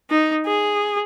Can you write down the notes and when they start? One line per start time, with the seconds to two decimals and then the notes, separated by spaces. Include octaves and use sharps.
0.10 D#4
0.46 G#4